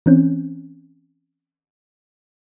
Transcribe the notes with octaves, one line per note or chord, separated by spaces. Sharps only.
E3 C4 C#4